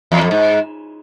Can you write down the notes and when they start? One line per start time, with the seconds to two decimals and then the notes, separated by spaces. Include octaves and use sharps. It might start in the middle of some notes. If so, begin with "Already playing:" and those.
0.12 E2
0.21 F2
0.31 G#2